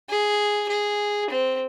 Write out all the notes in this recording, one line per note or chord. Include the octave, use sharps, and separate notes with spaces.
G#4
G#4
C4